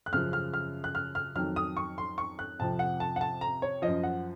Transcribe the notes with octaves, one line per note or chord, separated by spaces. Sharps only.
F#6
F#2 C#3 F3 F6
F6
F6
F#6
F6
F6
F2 D#3 F#3 F6
D#6
C#6
C6
C#6
F#6
F2 C3 F3 A5
F#5
A5
F#5
A5
A#5
C#5
F#2 F3 D#5
F#5